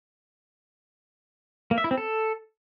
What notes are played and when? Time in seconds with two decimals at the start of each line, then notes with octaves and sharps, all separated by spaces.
1.71 A#3
1.78 E5
1.84 E4
1.91 C4
1.98 A4